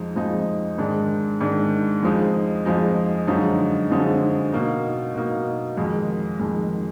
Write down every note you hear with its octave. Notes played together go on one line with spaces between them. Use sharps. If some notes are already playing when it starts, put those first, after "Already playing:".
Already playing: F2 F3 G#3 D#4
F2 F3 G#3 D#4
G#2 D#3 G#3 D4
G#2 D#3 G#3 D4
F2 F3 G#3 D#4
F2 F3 G#3 D#4
F#2 D3 F3 G#3 D#4
F#2 D3 F3 G#3 D#4
B2 A#3 D#4
B2 A#3 D#4
F2 D#3 G#3
F2 D#3 G#3